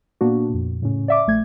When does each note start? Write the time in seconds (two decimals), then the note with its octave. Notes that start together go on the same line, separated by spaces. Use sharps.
0.21 A#2 A#3 B3 D4 F#4
0.49 F2 A#2
0.82 A2 C#3 C#4
1.08 D5 E5 D6
1.27 A#1 A3 G#6